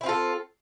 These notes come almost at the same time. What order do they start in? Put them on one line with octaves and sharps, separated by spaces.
E4 C4 F4 A4